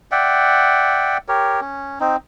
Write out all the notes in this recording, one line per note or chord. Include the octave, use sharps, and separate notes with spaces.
D5 E5 F#5 G5
G4 A#4 C#5
C#4
C4 D#4